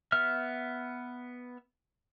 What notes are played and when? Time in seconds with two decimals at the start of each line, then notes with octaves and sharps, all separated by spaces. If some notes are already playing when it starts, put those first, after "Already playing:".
0.12 B3 E5 F6